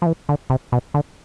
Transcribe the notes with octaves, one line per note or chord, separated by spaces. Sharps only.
F3
E3
D3
C3
B2
D3